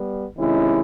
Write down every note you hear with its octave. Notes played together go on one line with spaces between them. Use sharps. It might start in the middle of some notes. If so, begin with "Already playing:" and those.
Already playing: G3 B3
C3 D#3 G#3 C#4 E4